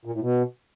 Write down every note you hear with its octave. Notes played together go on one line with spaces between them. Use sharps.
A#2
A2
B2